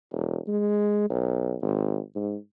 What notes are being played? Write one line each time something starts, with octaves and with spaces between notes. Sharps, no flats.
E1
G#3
B1
G#1
G#2